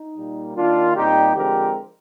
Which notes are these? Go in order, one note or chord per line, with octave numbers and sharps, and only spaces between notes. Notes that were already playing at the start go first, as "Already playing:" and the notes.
Already playing: D#4
A#2 G3 A#3
D#3 A#3 D4 F4
A#2 G3 C4 D#4 G4
D3 F3 G#3 C4 G4 A#4